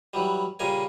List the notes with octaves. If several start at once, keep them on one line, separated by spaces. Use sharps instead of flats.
E3 F#3 G3
A#2 C#3 G3 A#4 G#5